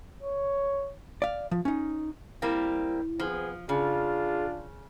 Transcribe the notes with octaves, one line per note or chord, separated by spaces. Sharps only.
C#5
D5 F5
F3
C#4 D#4
G3 A#3 C4 E4
F3 B3 C4 G#4
C#3 D4 F4 G#4